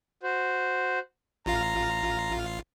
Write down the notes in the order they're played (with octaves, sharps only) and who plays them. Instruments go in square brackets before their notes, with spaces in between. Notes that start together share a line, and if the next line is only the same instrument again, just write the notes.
[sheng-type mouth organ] F#4 C5
[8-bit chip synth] A1 F4 F5 [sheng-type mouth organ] A#5